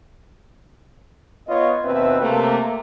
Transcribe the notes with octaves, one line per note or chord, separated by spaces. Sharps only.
B3 F4 C#5 D#5
D#2 B2 C4 B4 E5
C3 A3 A#3